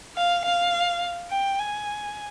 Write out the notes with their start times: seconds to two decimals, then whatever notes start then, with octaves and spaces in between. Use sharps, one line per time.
0.16 F5
0.45 F5
1.31 G5
1.59 G#5